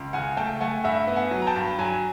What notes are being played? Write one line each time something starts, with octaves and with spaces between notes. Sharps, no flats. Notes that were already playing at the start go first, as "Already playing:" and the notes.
Already playing: C#2
C#3 F#5 G#5
A3 G5 A5
A3 F#5 G#5
G2 E5 F#5
B3
F#5 G#5
F#3
A#5
G5 A5
G2
F#3 G#5 A#5